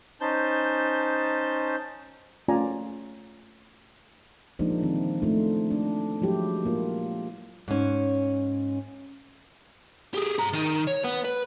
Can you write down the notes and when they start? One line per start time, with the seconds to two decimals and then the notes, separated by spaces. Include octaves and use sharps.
0.21 C#4 D#4 C5 A5 G6
2.48 A3 C#4 F4 D5 G#5 A#5
4.59 F3 G#3 A#3 D4 D#4 C5
4.83 D#3 C4 E4
5.22 A3 D4 D#4 F4
5.71 D4
6.22 F3 F#3 G#3 E4 G4
6.65 A#3 F4
7.68 G#2 C#4
10.14 G4 G#4
10.38 G#4 A#5
10.53 D#3 D#4
10.87 C#5
11.05 B3
11.25 B4